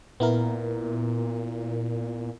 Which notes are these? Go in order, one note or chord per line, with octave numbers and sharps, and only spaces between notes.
A#2 B3 E4 A#4